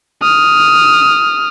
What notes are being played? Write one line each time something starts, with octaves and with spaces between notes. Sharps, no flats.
D#6 F6